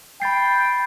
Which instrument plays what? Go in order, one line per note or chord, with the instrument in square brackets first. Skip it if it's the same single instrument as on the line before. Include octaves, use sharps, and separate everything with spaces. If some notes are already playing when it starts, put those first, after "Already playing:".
[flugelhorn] G5 [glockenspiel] B5 A6 C7